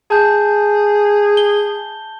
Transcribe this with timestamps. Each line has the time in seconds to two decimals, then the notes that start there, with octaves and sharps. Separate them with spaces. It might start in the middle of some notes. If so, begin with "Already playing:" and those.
0.11 G#4 A5 G6
1.37 G7